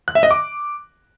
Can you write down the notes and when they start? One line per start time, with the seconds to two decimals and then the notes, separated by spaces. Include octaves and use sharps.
0.08 F#6
0.15 E5
0.23 D#5
0.31 D6